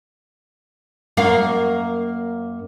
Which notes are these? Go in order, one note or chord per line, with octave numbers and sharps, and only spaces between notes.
F#2 A#3 F5